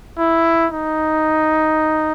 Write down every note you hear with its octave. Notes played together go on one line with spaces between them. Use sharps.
E4
D#4